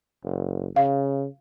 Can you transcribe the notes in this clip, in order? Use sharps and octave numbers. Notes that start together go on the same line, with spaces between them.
F#1
C#3 F5